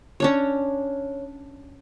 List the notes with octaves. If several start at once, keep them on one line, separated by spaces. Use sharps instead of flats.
C#4 D4 C#5